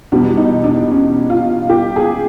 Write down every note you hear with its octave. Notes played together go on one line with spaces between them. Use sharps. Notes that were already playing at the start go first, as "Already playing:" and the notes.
E2 B2 G3 D4
D#4
D4
C#4
F4
G4
G#4